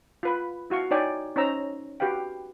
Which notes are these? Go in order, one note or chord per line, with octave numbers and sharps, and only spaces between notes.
F4 B4 B5
E4 F#4 F5 C#6
D#4 C#5 D5 G5 G#5
C#4 D#4 C5 C#5 A#5 E6
F#4 G4 B4 F5 G5